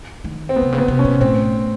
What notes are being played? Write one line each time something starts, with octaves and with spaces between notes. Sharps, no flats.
D#3
C4
B3
C3
C#3
B3
C3
C#4
B2
A2 C4